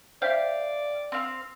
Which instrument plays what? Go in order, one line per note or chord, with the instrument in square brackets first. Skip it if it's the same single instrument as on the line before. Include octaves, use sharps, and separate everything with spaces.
[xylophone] C5 E5 [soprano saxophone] D5 [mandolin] F5 [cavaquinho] G5
[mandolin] C4 F5